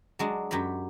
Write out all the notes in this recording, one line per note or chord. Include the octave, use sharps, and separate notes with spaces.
F#3 G#3 D4
F#2 F#3 G4 B5